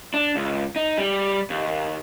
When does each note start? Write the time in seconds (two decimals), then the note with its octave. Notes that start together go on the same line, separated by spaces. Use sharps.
0.14 D4
0.36 C#2
0.76 D#4
0.98 G3
1.50 D#2